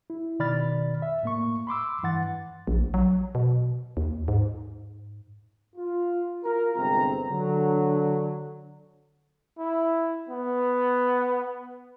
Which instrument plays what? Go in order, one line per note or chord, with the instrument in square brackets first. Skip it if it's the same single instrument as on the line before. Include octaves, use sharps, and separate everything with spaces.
[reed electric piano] E4
B2 D#3 D5 B5 F6 A6
E5
A2 A#3 C#6
B5 C6 D6 E6
G2 E3 F#5 A6
[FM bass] A#1
F#3
B2
D#2
G#2
[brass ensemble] F4
F4 A#4
G1 C3 G#3 C4 A#5
D3 F#3
[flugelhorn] E4
B3